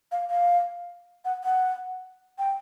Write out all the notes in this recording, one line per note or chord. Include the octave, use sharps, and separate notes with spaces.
F5
F5
F#5
F#5
G5